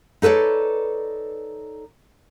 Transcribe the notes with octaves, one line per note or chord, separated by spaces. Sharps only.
D#4 A4 B4 C#5 D5